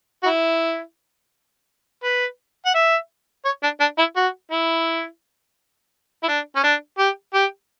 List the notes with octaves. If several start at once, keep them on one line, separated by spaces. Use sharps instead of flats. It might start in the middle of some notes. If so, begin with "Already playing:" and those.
F#4
E4
B4
F#5
E5
C#5
D4
D4
E4
F#4
E4
E4
D4
C#4
D4
G4
G4